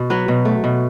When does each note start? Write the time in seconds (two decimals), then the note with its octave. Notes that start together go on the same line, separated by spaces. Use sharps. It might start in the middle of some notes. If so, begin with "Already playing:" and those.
Already playing: B2
0.10 F#3 B4
0.28 B2
0.45 A3
0.64 B2